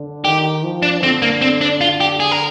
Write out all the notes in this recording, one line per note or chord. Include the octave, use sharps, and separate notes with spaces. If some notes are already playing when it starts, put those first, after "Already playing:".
Already playing: D3
D#3 G4
F3
D4
D3 C4
A#3
C4
D4
F4
G4
G#4
A#4